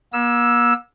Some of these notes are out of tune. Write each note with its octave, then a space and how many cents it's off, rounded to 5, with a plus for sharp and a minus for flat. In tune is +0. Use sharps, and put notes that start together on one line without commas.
A#3 +45 E6 +0